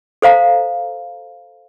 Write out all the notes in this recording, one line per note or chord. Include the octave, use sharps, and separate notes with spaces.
A4 C5 F5 A#5